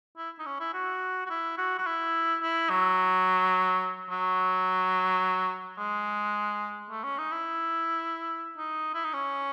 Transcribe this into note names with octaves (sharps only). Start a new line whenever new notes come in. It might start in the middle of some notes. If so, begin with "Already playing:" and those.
E4
D#4
C#4
E4
F#4
F#4
E4
F#4
F#4
E4
E4
F#3
F#3
G#3
A3
C#4
D#4
E4
D#4
E4
D#4
C#4